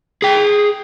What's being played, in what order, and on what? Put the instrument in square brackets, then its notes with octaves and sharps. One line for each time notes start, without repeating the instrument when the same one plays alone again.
[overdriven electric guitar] G#4 G5